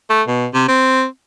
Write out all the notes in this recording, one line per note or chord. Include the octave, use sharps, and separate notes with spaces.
A3
B2
C3
C4